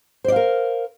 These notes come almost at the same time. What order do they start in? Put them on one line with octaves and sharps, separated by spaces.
C5 D5 F5 A#4